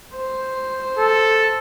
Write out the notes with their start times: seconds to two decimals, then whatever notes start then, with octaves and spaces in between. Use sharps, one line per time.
0.16 C5
0.98 A4